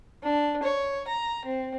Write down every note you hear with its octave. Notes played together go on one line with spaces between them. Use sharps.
D4
C#5
A#5
C4